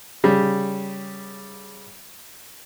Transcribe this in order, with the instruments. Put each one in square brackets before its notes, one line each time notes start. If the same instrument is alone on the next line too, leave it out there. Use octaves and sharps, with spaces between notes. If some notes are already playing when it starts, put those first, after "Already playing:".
[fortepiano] C#3 G3